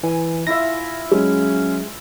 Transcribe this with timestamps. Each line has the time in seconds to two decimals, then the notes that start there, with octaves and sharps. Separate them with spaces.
0.03 E3 G#5
0.47 E4 F4 E5 A#6
1.11 F#3 G#3 C#4